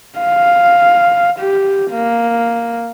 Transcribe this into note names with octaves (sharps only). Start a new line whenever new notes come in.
F5
G4
A#3